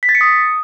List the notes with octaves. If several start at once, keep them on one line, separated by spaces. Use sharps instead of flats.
B6
A6
C#7
D#6